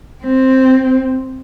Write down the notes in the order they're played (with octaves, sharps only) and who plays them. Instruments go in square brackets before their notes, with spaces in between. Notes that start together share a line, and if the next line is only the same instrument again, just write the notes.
[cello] C4